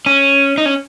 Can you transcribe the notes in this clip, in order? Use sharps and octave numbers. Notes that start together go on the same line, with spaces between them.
C#4
D#4
C#4